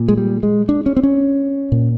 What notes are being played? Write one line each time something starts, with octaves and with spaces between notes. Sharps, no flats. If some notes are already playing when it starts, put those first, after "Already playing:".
Already playing: A#2
G#3
G3
G#3
D4
C#4
C4
C#4
A#2